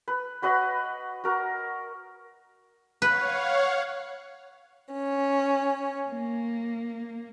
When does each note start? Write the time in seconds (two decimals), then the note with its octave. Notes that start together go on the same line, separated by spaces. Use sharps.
0.08 B4
0.42 F#4 B4 D#5 F#5
1.24 F#4 A#4
3.02 B4 C#5 F5 F#5
4.92 C#4
6.10 A#3